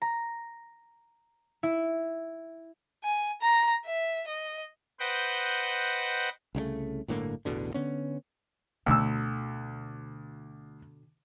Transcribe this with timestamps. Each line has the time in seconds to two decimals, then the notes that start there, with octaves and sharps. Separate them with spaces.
0.02 A#5
1.63 E4
3.04 G#5
3.41 A#5
3.86 E5
4.28 D#5
5.00 B4 C5 D#5 F#5 G5
6.55 C2 C#3 F#3 A3
7.08 G1 A2 D3 A#3
7.45 A1 E2 B2 D3
7.74 D3 B3 C#4
8.86 D2 B2 D3 E6